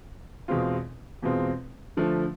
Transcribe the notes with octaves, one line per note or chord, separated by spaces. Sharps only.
E2 B2 G#3 C4 F4
E2 B2 G#3 C4 F4
D3 F3 A3